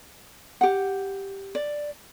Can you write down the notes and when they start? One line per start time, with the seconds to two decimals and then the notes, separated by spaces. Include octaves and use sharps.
0.61 G4 F#5
1.55 D5